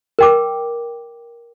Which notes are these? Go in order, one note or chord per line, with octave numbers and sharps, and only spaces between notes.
A#4 G5 D6